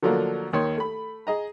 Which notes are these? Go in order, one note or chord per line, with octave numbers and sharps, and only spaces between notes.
D3 F3 F#3 A3 A#3 D4
D#2 D#3 C#5 C6
A3 B5
G#4 D#5 A#5